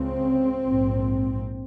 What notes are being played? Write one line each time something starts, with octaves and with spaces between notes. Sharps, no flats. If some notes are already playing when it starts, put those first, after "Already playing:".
Already playing: C#2 C#3 C4
A#1 G#2